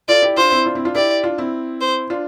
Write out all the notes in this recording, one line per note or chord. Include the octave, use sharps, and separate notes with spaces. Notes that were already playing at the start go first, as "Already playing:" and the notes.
F4 A4 D5
E4 G4
D4 F4 C5
C4 E4
D4 F4
C4 E4
D4 F4
E4 G4 D5
D4 F4
C4 E4
C5
D4 F4